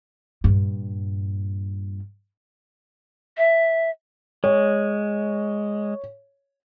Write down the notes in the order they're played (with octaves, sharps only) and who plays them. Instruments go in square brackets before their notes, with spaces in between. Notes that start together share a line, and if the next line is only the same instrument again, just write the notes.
[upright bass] G2 A#2
[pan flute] E5
[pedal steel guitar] G#3 [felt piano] C#5